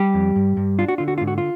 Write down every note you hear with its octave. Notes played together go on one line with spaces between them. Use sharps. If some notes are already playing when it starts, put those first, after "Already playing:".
Already playing: G3 G4
F2
G2
G2
D4 F4
F#4
D3 F4
F#4
G#2 F4
F#4
F4